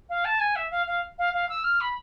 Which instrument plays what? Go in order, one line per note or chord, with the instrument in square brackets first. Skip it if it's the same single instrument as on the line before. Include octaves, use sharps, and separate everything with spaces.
[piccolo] F5
A5
G#5
E5
F5
F5
F5
F5
E6
F6
B5